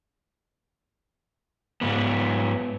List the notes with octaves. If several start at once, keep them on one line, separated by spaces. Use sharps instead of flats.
G#2 B3